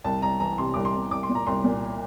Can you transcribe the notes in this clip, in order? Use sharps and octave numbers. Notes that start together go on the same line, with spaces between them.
C2 A5
C2 A#5
E3 A#5
C3 C6
C2 D6
C6
C2
C2 D6
C6
A#2
A#5
C2 C6
A#2